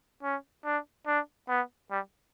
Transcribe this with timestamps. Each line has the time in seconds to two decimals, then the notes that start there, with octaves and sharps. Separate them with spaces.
0.23 C#4
0.65 D4
1.07 D4
1.49 B3
1.91 G3